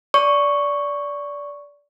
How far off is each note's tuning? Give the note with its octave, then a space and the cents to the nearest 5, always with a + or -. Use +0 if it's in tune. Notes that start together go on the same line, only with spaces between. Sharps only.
D5 -20 C#6 +0